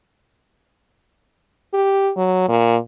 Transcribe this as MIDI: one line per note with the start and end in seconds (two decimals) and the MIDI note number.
1.74 2.11 67
2.17 2.43 54
2.48 2.76 46